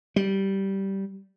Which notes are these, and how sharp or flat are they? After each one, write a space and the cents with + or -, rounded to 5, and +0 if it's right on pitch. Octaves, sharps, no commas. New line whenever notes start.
G3 -15